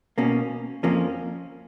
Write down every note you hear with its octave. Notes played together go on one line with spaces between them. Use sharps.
B2 A#3 C#4
F2 F3 A#3 C#4